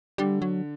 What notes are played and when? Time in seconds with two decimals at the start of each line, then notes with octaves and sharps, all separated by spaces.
0.18 D3 G3
0.42 F#3